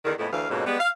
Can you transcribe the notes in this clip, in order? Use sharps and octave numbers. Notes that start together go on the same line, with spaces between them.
E2 D3 D#3
F2 A2 G#3 B3 E4
D2 E3 F5
F2 G#2 B2 A#3 C#4
G3 G#3 B3
F5